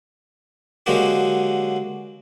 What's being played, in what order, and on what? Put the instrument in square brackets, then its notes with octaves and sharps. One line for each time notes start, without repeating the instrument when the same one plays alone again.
[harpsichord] D3 F#3 G#3 A#3 F#4 G4